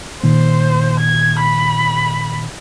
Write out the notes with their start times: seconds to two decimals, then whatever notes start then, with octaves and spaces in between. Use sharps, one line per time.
0.23 A#2 D#3 C5
1.00 G#6
1.41 B5